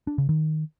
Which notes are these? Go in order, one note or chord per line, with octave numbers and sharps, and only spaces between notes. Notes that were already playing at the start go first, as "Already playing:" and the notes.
D4
C#3
D#3